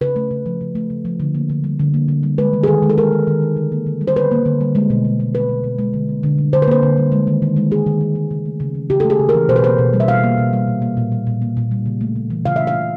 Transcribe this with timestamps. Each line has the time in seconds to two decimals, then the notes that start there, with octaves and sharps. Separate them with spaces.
0.01 C#3 B4
0.16 A3
0.31 C#3
0.46 F3
0.61 C#3
0.75 A3
0.90 C#3
1.05 F3
1.20 D3
1.35 A#3
1.50 D3
1.64 G3
1.79 D3
1.94 A#3
2.08 D3
2.23 G3
2.38 G#3 B4
2.53 D#3
2.63 G#4
2.67 D#3 A4
2.82 G#3
2.90 A4
2.98 G#3 A#4
3.13 D#3
3.27 D#3
3.42 G#3
3.57 D3
3.72 A#3
3.87 D3
4.01 G3
4.08 C5
4.16 D3 B4
4.31 A#3
4.45 D3
4.61 G3
4.75 G#3
4.90 B2
5.05 B2
5.20 G#3
5.34 G#3 B4
5.49 B2
5.64 B2
5.79 G#3
5.94 D3
6.09 A#3
6.23 D3
6.38 G3
6.53 D3 C5
6.62 B4
6.68 A#3 C5
6.83 D3
6.97 G3
7.12 G#3
7.27 D#3
7.42 D#3
7.57 G#3
7.71 G#3 G#4
7.86 D#3
8.01 D#3
8.15 G#3
8.31 C#3
8.45 A3
8.60 C#3
8.75 E3
8.90 C#3 G4
9.00 A4
9.04 A3
9.10 G#4
9.19 C#3
9.29 A#4
9.34 E3
9.49 B2 C5
9.56 B4
9.64 A#3 C5
9.79 B2
9.93 G3
10.00 E5
10.08 B2 F5
10.23 A#3
10.38 B2
10.53 G3
10.68 A#2
10.82 A#3
10.97 A#2
11.12 G3
11.27 A#2
11.42 A#3
11.57 A#2
11.71 G3
11.86 C#3
12.01 A3
12.16 C#3
12.30 E3
12.45 C#3 F5
12.56 A3 E5
12.67 F5
12.75 C#3